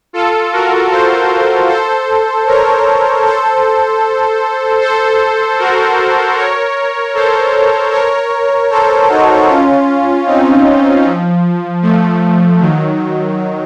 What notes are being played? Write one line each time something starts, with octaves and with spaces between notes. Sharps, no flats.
F4 A4
F#4 A#4
A4 C5
A4 C5
A#4 C#5
A4 C5
A4 C5
F#4 A#4
A#4 C#5
A4 C5
A#4 C#5
A4 C5
D#4 F#4
C#4 F4
C4 D#4
F3
F3 A3
D#3 F#3